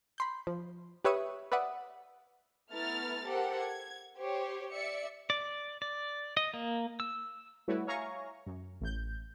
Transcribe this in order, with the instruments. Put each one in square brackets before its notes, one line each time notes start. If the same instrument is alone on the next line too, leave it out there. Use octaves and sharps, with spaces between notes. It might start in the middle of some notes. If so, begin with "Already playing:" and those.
[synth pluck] B5 C6 G6
F3
G4 B4 C#5 E5 C#6 D#6
B4 D5 E5 F#5 D#6
[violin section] A3 B3 E4 A#5 F6 A6
G4 A4 A#4 C5 F#5
G#6
G4 C5 C#5
D5 E5 C#7
[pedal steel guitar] D5
D5
D#5
A#3
E6
[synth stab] G3 A3 E4 F#4 B4 C#5
C#5 E5 F5 G#5 A#5 C#6
F#2
A1 G6